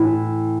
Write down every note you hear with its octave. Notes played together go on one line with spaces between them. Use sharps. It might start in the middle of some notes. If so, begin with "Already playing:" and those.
Already playing: A2 E3